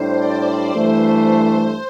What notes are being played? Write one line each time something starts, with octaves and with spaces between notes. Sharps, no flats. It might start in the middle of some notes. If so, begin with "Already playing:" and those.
Already playing: A2 G3 D4 C5
D5
G2 E3 A3 C5
C5